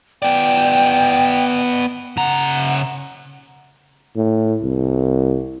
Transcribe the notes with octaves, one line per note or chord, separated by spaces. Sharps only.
B3 D5 G5
C#3 F#5 A#5
A2
C2